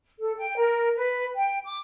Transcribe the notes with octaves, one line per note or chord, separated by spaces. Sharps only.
A4
G5
A#4
B4
G5
D6